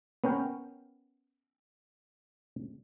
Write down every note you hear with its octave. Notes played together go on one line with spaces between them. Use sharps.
B3 C#4 A#4 G5